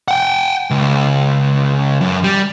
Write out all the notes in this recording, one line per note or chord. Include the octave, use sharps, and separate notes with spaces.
F#5 G5
C#2
F#2
G3